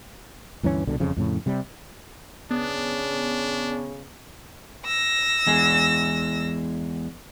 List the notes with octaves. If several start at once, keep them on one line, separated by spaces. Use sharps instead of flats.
D2 G2 E3 C#4
C2 B2 D3
E1 F2 C#3 F3
F2 A2 C#3
C3 G3
C#3 B3 D4
E6 A#6
E2 G#3